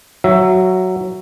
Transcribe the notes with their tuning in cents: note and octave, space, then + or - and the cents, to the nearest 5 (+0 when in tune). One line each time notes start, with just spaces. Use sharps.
F#3 +0 E5 +15